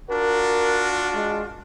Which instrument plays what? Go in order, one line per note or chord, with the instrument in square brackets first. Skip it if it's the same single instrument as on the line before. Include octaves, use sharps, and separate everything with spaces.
[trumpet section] D4 F4 F#4 [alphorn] A#4
[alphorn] G#3